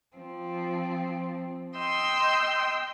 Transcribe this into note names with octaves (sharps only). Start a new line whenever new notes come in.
F3 C4
D#5 G5 C6 E6